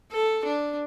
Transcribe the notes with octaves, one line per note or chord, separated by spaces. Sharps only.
A4
D4